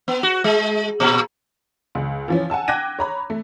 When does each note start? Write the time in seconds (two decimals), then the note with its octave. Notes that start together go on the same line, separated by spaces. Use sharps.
0.08 B3
0.23 F#4
0.44 G#3
1.00 A#2
1.95 C#2
2.28 E3 F3 C#4
2.50 F#5 G#5 A5 E6
2.68 G5 D6 F#6 G#6 A#6 D#7
2.99 C#5 A#5 B5
3.30 A3